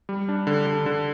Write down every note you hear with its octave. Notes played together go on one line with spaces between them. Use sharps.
G3
D4
D3
D3
D3